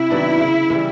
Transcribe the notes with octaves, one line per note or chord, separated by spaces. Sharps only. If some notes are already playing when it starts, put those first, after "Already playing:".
Already playing: C3 E4
D#3 F#3 B3 D4
C#3
E3 G3